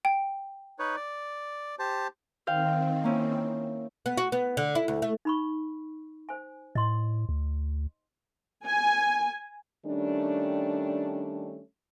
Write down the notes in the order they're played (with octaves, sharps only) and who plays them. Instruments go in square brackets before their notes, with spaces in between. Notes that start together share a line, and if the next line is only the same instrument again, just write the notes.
[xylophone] G5
[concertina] D#4 B4 C#5
D5
G4 C5 A5
[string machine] D#3 C4 [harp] C5 F5 G5
[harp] A#3 C#4 E4
[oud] B3
F#4
B3
D3
E4
D2
A3
[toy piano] D#4 B5 C#6
C5 G#5
[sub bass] A2 [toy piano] D#5 C6
[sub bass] D2
[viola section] G#5
[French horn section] D#3 G3 A3 C#4 D4